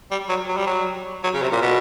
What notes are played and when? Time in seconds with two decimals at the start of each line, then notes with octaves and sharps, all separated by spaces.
0.11 G3
0.29 F#3
0.49 F#3
0.57 G3
0.67 F#3
1.24 F#3
1.34 C#3
1.42 C3
1.52 A#2
1.62 B2